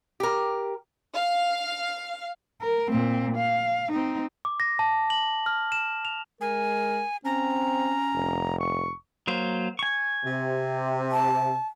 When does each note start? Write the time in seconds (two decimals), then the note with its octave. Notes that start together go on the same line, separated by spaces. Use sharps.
0.20 G4 A#4
1.15 F5
2.61 A#4
2.90 A#2 C4
3.37 F5
3.91 C4 D#4
4.45 D6
4.60 A#6
4.79 A5
5.10 F#7
5.46 F6
5.72 E7
6.05 F7
6.41 G#3 A#4 G#5
7.25 C4 C#4 A#5
8.14 F1
8.60 C#6
9.27 F#3 A#3 C5
9.79 G#5 C#6
10.25 C3
11.11 A5